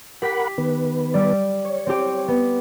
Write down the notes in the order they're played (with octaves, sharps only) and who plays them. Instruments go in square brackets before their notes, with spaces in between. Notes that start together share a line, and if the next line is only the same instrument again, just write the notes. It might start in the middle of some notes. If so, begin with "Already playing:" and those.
[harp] G4 B6 [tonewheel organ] A#4 F#5 B5
[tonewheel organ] D#3 B3 B4
[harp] G3 D5
[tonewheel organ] C#5
[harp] C4 G4
B3